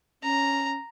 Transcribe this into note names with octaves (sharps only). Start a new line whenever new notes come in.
C#4 A#5